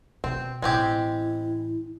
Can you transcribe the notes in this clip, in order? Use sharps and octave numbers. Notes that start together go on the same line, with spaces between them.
B2 C4
A1 G#3 C4 E4 G4